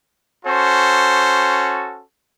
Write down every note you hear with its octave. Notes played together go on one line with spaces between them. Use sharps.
C#4 F#4 A4 C5